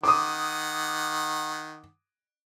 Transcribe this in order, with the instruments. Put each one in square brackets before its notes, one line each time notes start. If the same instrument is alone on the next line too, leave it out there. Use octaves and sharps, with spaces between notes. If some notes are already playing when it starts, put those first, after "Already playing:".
[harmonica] D#3 F#5 [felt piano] D6 D#6